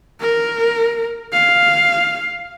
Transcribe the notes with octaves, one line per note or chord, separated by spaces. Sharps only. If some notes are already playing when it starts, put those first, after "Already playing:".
A#4
F5